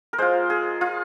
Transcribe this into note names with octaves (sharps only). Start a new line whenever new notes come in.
A#4
G#3 F4 C5
G#4
F4